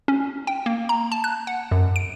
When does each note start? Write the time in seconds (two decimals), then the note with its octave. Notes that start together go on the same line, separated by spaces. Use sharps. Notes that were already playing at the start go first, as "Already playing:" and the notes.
0.08 C#4
0.47 G5
0.66 A#3
0.89 A#5
1.12 A5
1.24 F#6
1.47 F#5
1.71 F#2
1.96 D7